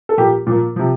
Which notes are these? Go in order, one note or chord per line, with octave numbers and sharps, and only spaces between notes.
A4
A#2 F3 A#3 G4
A#2 F3 A#3
C3 F3